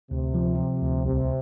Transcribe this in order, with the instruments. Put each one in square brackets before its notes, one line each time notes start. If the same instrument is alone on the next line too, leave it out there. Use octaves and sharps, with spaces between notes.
[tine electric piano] D2 [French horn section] C3
[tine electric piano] F3
F3
D2
[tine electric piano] C2 [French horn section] C3